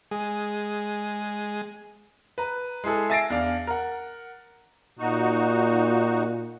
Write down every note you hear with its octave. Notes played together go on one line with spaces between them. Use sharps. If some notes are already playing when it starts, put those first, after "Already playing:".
G#3 G#4
B4 A#5
G#3 E4 G#4 A4
E5 G#5 A6 A#6 C7 D7
E2 D4 F5
A#4 F#5
A#2 D#4 F#4